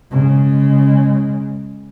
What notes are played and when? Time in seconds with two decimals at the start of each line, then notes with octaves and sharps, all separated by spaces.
0.11 C#3 G#3